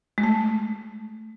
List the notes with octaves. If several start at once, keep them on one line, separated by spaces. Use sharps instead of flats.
G#3
A3